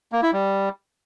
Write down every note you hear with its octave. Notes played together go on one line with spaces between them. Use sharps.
A#3
E4
G3